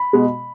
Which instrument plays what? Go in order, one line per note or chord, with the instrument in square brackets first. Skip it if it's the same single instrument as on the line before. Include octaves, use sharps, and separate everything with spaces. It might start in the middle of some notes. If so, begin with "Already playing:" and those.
Already playing: [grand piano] B5
[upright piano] B2 G#3